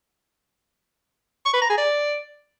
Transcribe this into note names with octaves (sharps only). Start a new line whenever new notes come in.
C#6
B4
A#5
G#4
D5